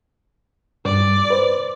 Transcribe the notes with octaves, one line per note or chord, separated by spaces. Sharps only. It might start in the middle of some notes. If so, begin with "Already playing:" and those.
G2 D5
B4 C5